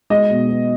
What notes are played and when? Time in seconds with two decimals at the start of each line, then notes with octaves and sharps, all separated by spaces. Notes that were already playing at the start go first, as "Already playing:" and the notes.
0.10 G#3 D#5
0.30 B2
0.49 B3